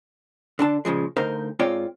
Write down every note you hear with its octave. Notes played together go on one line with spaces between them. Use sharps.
D3 D4 A5
A#2 C#3 F3 G#3
D2 D#4 A#4 C5 F5
G#2 C4 F4 C#5 D5 G5